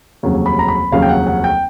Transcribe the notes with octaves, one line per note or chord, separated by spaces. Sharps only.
F1 D#2 C#3 F#3
B5
A#5
B5
F1 D#2 C#3 F#3 F5
G5
F#5
F#5
G5